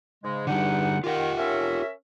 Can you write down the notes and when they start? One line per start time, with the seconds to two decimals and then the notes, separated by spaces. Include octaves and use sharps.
0.23 G#2 C#3 G#3
0.47 E2 D3 G3 D#4 F#5
1.04 D#3 F4 G4 F#5
1.38 C#4 A#4 E5